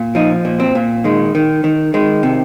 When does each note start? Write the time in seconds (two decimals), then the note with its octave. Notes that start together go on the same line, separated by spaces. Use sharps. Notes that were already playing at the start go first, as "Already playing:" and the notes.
Already playing: A#2
0.15 F3 D#4
0.45 A#2
0.60 C4
0.75 A#2
1.04 D#3 G#3
1.35 D#3
1.64 D#3
1.94 D#3 G#3
2.23 C3